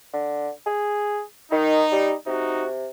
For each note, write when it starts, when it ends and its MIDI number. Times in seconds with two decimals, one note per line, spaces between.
0.13 0.49 50
0.66 1.22 68
1.52 1.84 51
1.52 2.15 63
1.92 2.14 55
2.27 2.90 48
2.27 2.67 63
2.27 2.67 66